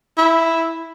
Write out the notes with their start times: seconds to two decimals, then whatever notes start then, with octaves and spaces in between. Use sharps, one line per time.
0.18 E4